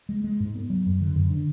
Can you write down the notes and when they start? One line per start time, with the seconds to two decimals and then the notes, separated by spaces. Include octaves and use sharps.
0.09 G#3
0.24 G#3
0.40 G#2
0.55 B3
0.70 F#3
0.86 F#2
1.01 D3
1.15 F#2
1.30 D3